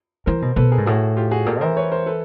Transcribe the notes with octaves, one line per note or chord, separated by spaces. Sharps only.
E3 A#4 C5
B2
B2 A4 B4
G#4 A#4
G#2
A2 F#4 G#4
F4 G4
F#4 G#4
A#2 G4 A4
E3 A#4 C5
B4 C#5
A#4 C5
A4 B4